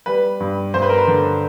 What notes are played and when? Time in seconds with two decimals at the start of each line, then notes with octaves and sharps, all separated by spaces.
0.06 G3 B4
0.40 G2
0.74 G2 C5
0.82 B4
0.89 A#4
0.98 B4
1.07 D3